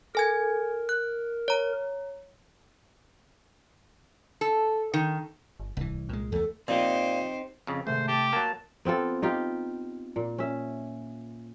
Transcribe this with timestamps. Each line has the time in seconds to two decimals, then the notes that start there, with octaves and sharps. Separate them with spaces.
0.15 A4 A#4 G#5 G#6
0.89 F#6
1.48 C#5 A#5
4.41 A4
4.94 D#3
5.60 G1
5.77 D1 C2 E3
6.09 C2 A#2 G#3
6.32 E2 A3 A4
6.68 A#2 C4 D#4 G4 C5
7.67 F2 C#3
7.87 G#1 C3 A3 C5
8.08 G4 A5
8.33 F#3 A#3 A5
8.85 B3 C4 F4 A4
9.22 D#4 F4 G4
10.16 A#2
10.38 C#4 E5